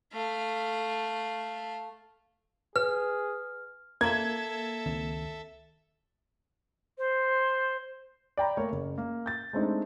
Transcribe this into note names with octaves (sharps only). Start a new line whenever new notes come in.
A3 F5
G#4 B4 F6
A#3 A4 E5 G#6
C#2 D#3 C4
C5
D5 G5 A#5 B5
A3 A#3 A#4 C#5
F#1
A#3
G6 A6
G#3 A3 C4 D4 D#4